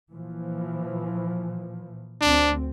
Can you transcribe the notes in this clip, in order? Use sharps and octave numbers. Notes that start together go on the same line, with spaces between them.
A#2 E3 F3
D2 C4 D4